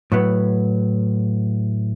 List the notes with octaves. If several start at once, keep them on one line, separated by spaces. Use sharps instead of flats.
A2 F#3 B3